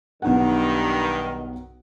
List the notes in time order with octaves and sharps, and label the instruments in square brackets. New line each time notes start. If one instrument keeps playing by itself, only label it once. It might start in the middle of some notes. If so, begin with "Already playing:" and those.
[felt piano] B1 D#4 F#5 [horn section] G2 D#3